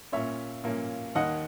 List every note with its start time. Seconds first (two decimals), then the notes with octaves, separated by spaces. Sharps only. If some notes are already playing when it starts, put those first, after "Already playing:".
0.12 A#2 A#3 C#4 C#5 E5
0.64 A#2 A#3 C#4
1.15 D#2 D#3 A#3 D#5 F#5